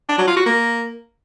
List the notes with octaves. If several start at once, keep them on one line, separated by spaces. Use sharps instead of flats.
D4
F#3
F4
F#4
A#3